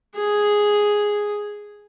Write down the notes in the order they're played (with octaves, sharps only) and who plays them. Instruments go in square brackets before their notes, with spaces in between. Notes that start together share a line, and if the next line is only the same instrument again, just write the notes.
[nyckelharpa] G#4